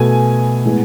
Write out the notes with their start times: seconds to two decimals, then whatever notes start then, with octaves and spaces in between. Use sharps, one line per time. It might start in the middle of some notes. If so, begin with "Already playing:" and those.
Already playing: B2 A3 G#5
0.65 A2 G#3 B3